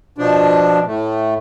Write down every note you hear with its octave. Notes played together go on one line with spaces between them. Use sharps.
B2 F3 D4
A2 A3